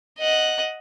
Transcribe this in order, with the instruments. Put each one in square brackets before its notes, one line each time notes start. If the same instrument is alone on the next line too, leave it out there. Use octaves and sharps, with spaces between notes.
[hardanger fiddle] D#5 F#5